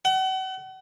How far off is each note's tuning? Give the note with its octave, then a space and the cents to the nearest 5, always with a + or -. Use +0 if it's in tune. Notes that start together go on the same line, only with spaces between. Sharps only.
F#5 +40